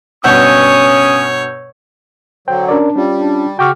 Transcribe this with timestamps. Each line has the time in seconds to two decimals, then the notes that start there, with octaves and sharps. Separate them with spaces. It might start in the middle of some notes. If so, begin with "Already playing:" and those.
0.24 G2 B2 C#4 C#5 F#5 D#6 E6 G6
2.48 D3 F#3 C5 G5
2.69 C#4 D4 A#4 D5
2.96 G3 C#4 F4
3.18 D4
3.59 C#3 F#4 G5 D6 F6